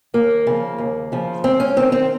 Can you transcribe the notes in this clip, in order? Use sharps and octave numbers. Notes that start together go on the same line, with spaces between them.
D#2 A#3
C#3 F3
D#2
C#3 F3
G#2 C4
C#4
D#3 C4
C4